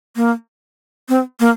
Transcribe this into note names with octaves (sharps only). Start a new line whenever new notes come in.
A#3
C4
A#3